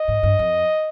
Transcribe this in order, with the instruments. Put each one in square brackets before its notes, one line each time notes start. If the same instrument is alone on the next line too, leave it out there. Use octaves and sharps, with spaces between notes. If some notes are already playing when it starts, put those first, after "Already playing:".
Already playing: [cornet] D#5
[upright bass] G#2
G2
F2